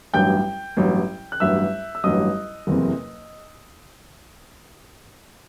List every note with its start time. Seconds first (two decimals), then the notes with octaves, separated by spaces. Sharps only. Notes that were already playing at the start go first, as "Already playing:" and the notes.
0.13 A1 G2 F#3 G5 G6
0.77 A1 G2 F#3
1.32 F#6
1.40 A1 G2 F#3 E5 E6
1.95 E6
2.04 A1 G2 F#3 D#5 D#6
2.67 F#1 E2 C3